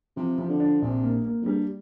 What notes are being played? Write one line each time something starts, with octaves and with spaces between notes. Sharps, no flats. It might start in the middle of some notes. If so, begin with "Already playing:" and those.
C3 F3
C3 F3
D3
D4
A#1 C3
A#3
A#3
F2
G2 G3